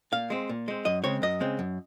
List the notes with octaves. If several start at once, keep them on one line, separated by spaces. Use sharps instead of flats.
A#2 F5
G#3 C4
A#2
G#3 C4
F#2 D#5
C#3 G#3 C4 C#5
F#2 D#5
C#3 G#3 C4
F#2